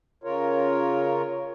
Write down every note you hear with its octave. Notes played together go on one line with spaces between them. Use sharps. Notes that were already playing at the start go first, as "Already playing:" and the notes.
C#3 F4 A#4 C#5